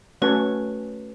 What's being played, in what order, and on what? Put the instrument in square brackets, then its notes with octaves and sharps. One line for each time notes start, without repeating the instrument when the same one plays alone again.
[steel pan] A3 C#4 F#4 A4 C#5 [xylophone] B4